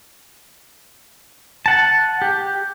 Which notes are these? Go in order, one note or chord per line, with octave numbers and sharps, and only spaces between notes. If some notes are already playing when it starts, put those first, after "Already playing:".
F#5 A5
G4